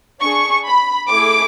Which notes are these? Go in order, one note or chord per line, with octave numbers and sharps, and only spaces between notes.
D4 G#4 C#6
B5
A3 E4 G#4 D6